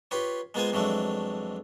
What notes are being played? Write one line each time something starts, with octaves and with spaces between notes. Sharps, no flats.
F4 G4 B4 C#5
G#3 A#3 B3 F4 C5 G#5
F2 E3 F#3 G#3 A3 D4